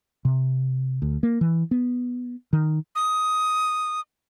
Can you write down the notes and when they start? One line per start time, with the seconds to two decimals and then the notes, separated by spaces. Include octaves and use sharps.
0.25 C3
1.02 D2
1.23 A#3
1.41 E3
1.71 B3
2.53 D#3
2.95 D#6